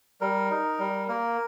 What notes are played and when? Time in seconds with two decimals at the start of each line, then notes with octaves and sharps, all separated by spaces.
0.21 G3 A#4
0.51 D#4
0.79 G3
1.08 A#3 A#4